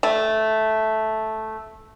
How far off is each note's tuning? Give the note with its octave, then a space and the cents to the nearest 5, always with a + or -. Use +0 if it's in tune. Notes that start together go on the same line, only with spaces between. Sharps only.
A3 -5